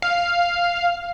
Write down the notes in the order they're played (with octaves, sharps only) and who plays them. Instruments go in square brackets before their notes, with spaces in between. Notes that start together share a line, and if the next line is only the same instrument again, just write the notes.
[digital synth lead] F5